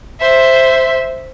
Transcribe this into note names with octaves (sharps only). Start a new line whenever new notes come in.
C5 E5